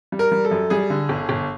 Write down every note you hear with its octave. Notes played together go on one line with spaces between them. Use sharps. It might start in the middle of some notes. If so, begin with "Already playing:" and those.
G3
A#4
G3
A4
F#2
G3 G#4
D3
G1
G1